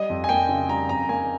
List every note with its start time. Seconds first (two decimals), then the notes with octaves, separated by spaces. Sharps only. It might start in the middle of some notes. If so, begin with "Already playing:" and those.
Already playing: G3 D#5
0.10 F2
0.24 G#5
0.29 A#3 G5
0.49 C#3
0.69 G3 A#5
0.89 F2 A#5
1.09 A#3 G#5